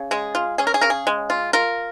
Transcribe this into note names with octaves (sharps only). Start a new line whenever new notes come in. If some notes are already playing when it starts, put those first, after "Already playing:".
Already playing: C#3
G#3 G#4
F4
C#4 G#4
A#4
G#4
C#3 A#4
G#4
G#3
F4
F4 A#4